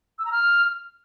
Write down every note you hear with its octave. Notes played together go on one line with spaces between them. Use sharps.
E6
A#5
F6